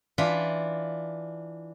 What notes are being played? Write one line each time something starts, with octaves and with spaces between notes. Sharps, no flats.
E3 D4 F4 F5 B5